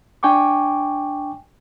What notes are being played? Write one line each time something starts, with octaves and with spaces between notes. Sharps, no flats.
D4 G5 G#5 C#6 D6